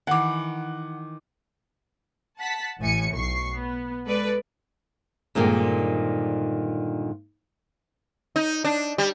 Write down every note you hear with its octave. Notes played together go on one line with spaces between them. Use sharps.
D#3 E3 F#5 D6
F#5 A5 B6
A1 A2 G#5 C#7
B1 C#6 C7
B3
G#3 A4 B4 D5
G2 A#2 D3 D#3 G#3 C4
D#4
D4
G3